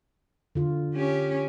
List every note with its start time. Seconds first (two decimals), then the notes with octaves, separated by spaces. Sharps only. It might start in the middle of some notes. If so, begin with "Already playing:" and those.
0.55 D3 F4
0.94 C#4 G4